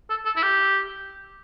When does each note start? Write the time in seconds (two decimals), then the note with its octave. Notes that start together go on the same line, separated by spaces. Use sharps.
0.10 A4
0.25 A4
0.36 E4
0.42 G4